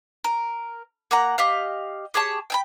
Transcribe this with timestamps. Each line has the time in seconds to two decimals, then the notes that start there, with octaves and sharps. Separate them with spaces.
0.24 A#4
1.11 A#3 F#5 A#5
1.38 G4 D#5 F5
2.14 G4 G#4 C#5 A5
2.50 G5 G#5 B5